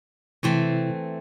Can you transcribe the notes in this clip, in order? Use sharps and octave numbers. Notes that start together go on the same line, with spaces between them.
C3 E3 A3 C4 E4